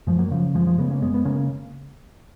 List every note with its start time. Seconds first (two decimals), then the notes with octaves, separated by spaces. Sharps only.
0.07 F#2 F3 G#3
0.18 F#3 A#3
0.31 C#3 F3
0.54 F#2 F3 G#3
0.66 F3 G#3
0.78 C#3 G#3 B3
0.90 A#3 C#4
1.02 F#2 G#3 B3
1.14 B3
1.25 C#3 A#3 C#4